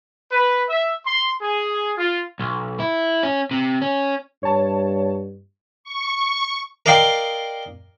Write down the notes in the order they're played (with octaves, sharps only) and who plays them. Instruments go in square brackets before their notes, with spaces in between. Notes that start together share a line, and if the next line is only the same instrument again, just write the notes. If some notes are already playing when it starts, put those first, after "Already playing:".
[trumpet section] B4
E5
C6
G#4
F4
[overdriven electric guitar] B1
E4
C#4
C3
C#4
[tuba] G2 [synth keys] C#5 A5
[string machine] C#6
[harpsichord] A#4 D5 D#5 F5 G5 C6